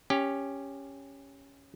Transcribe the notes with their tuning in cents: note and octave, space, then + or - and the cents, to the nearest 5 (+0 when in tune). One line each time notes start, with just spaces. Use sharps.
C#4 +0 G4 +15